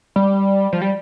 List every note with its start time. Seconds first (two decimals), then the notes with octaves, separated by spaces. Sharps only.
0.16 G3
0.72 F3
0.82 G3